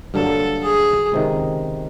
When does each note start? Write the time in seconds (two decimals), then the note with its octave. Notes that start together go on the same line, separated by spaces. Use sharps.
0.14 G2 D3 F#3 A#3 A4
0.63 G#4
1.12 C#2 C3 D#3